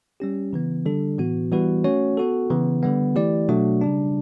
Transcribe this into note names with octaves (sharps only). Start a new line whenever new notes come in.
G3 C#4 G4
C#3 E3 B3
D3 G3 D4 A4
A2 E3 B3 F#4
E3 G3 B3 F#4 B4
A3 C#4 F#4 C#5
B3 F#4 A4
C#3 E3 B3
D3 G3 B3
E3 A3 E4 G4 D5
B2 F#3 A3 D4 F#4
C#3 G3 D4